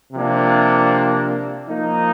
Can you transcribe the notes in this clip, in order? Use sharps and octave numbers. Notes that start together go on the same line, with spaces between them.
C3 F3 A#3 D4
F3 A#3 D#4